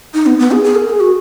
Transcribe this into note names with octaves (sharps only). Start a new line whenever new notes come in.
D#4
B3
B3
G#4
G#4
A#4
G#4
F#4